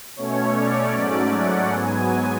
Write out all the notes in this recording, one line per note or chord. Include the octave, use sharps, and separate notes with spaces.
B2 A3 C#4 C#5
D5
G#2 F#3 A3 C#4
F#5
G#2 F#3 B3 G#5